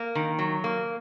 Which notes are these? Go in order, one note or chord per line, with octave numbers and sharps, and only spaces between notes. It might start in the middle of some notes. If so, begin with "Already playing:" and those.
Already playing: A#3
D#3
F#3
A#3